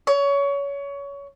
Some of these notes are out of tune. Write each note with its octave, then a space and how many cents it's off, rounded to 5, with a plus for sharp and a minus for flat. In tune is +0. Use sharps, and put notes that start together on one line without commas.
C#5 +25